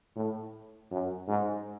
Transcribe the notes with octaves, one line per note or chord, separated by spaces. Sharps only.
A2
F#2
G#2